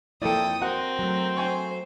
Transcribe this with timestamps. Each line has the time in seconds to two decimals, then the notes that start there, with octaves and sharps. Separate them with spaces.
0.22 F2 A#3 E4 A4 D5 G5 D#6
0.62 C4 F#4 A#4 F#5
0.99 F#3 A3
1.37 C5 G5 G#5 C#6